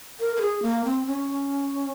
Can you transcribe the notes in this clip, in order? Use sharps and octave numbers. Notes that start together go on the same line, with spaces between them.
A#4
A#4
G#4
A#3
C4
C#4